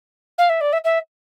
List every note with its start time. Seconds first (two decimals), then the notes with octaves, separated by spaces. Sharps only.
0.38 F5
0.49 E5
0.61 D5
0.73 E5
0.84 E5